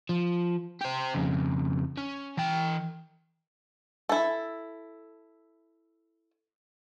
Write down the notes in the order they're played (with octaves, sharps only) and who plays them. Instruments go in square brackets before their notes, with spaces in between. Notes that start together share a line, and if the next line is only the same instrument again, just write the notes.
[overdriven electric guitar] F3
G4 C5
F2 C#3
C#4
E3 G5
[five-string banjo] E4 A4